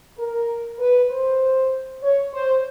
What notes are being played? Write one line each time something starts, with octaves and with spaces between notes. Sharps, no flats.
A#4
B4
C5
C#5
C5